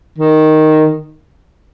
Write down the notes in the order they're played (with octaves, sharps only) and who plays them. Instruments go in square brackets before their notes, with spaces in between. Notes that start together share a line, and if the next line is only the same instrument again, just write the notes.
[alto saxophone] D#3